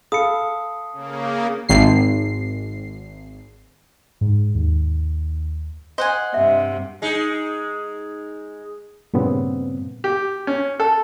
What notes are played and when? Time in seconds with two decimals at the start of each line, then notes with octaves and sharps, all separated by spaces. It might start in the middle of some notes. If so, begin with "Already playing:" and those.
0.12 A4 F5 B5 D#6 C#7
0.93 C#3 A#3
1.69 G#1 C7
4.21 G#2
4.55 D#2
5.98 C5 D#5 F#5 G#5
6.34 G2 C3 E5
7.02 G#3 D#4
9.14 G2 A#2 C#3 B3 C4
10.04 G4
10.47 C#4
10.80 A4